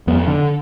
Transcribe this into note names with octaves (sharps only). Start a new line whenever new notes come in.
F2 B3
D3